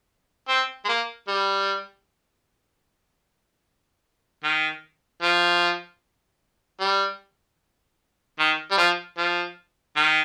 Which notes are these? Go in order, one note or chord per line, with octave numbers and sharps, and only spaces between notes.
C4
G#3
A#3
G3
D#3
F3
G3
D#3
G3
F3
F3
D#3